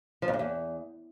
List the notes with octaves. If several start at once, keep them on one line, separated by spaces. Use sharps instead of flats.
F3
F2
G2
E2